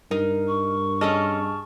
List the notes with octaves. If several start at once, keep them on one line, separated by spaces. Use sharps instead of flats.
G2 D#4 A#4
C#6
C#4 G#4 A4 D#5 A5 F6